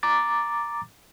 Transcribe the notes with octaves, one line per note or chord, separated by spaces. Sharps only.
A#5 D6 A6